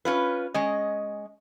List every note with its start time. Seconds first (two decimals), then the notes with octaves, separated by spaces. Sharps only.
0.05 C#4 F4 B4
0.54 G#3 C#4 D#5